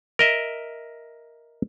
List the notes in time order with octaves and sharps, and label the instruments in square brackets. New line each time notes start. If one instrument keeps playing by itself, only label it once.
[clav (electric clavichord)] A#4 D#5 E5